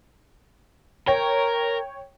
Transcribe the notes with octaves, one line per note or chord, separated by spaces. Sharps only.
A#4 C#5 G5